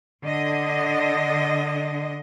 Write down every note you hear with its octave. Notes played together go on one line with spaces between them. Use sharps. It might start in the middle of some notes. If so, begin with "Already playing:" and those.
D3 D#5